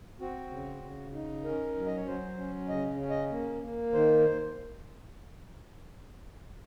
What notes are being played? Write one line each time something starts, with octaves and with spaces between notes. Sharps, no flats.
C4 F#4
C#3
C#3
D#4
C#4 A#4
F#3
D#5
C#5
F#3 C5
C#4
C#3 D#5
C#4
D#5
A#3
A#3
D#3 C5